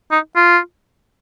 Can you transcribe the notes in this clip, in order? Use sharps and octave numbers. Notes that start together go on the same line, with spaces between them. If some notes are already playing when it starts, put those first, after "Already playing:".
D#4
F4